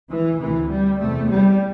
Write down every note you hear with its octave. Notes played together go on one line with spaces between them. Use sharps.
E3
D2 C3 E3
G3
E2 C3 A3
G3